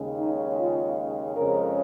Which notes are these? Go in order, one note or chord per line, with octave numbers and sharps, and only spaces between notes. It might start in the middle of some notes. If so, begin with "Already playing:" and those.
Already playing: D#2 C#3 G#3 C#4
D#4
F4
F2 C#3 G#3 C#4 A#4